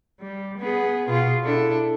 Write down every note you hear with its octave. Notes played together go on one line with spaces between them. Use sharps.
G3
B3 G#4
B2 F4 G#4
D4 E4 A4